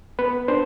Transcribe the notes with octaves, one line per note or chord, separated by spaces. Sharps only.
B3 B4
D4 C5